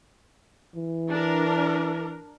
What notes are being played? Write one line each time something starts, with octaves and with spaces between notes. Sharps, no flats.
E3
D4 A#4